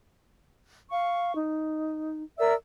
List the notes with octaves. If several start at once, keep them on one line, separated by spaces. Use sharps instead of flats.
F5 C#6
D#4
A#4 D5 E5 E6